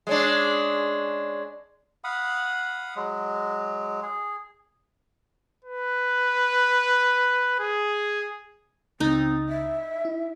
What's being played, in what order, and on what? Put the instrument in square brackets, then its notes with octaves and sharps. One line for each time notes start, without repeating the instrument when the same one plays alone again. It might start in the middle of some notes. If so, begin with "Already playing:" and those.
[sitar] G#3 C#4 D4
[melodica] F5 F#5 B5 D#6
F#3 G#3
G#4
[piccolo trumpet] B4
G#4
[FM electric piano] C#2 C#3 A6 [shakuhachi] C4 [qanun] D#4
[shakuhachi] E5
[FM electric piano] E4